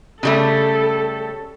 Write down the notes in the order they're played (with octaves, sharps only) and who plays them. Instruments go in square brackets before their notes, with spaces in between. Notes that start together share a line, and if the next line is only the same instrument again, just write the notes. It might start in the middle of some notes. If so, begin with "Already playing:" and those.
[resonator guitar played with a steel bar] C#3 G3 A3 [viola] A4